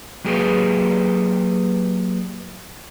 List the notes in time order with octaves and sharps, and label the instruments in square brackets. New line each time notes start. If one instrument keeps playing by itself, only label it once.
[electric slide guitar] F#3 A#3 G4 G#4 B4